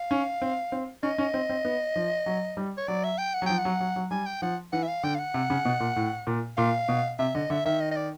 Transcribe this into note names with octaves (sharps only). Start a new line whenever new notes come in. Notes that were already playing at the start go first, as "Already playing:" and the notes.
Already playing: F5
C#4
C4
C4
C#4 D#5
C#4
C4
C4
B3
F3
F#3
G3
C#5
F#3 D5
E5
G5
F#5
F#3
F3 G5
F#5
F#3
F#3
F#3
G3 G#5
G5
F3 F#5
E3 F#5
E5
F5
D3 G5
F5
F#5
C3
C#3
B2
A#2
A2
A#2
A#2 F5
B2
C3 E5
D3 D#5
D3 E5
D#3 E5
D#5
D#5
D5